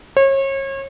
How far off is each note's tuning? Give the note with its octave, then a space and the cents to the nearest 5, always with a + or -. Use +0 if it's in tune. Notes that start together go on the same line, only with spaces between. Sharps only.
C#5 -35